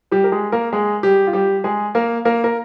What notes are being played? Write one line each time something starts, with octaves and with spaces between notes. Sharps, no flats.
G3 G4
A#4
G#3 G#4
A#3 A#4
G#3 G#4
G3 G4
F4
G3 G4
G#3 G#4
A#3 A#4
A#3 A#4
A#4